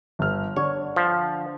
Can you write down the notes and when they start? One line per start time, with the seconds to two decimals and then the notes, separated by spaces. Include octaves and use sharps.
0.19 G1 F6
0.56 D3 C#5
0.96 F3